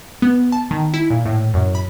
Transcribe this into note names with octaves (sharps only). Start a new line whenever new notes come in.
B3
A5
D#3
E4
A#2
A2
F#2
B5